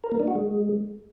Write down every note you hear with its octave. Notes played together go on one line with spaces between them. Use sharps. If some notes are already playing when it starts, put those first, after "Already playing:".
A#4
A#3
D4
F#4
G#3